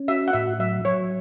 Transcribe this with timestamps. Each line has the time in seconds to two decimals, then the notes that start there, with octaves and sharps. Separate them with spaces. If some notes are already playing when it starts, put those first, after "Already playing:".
Already playing: C#4
0.08 F#4 E5
0.28 F#5
0.33 A2 E5
0.59 F#3 E5
0.85 F#3 C#5